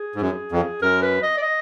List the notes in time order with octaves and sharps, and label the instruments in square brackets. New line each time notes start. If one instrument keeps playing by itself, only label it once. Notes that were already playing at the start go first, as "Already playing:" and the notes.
Already playing: [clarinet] G#4
[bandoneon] G#2
F#2
F2
[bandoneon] F#2 [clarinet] A#4
[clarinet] B4
D#5
D5
D#5